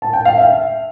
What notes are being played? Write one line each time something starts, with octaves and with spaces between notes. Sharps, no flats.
A5
G5
F5
E5